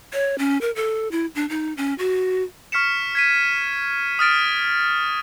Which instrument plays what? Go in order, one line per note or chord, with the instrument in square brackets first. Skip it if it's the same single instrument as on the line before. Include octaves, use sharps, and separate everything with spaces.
[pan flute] C#5
C#4
A#4
A4
E4
D4
D#4
C#4
F#4
[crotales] C#6 F6 B6 C#7 E7
G#6 B6 D#7
D#6 F6 A6 D7